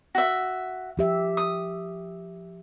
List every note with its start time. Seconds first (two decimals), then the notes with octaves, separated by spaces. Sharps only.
0.15 F#4 E5
0.97 F3 G4 E5
1.37 D#6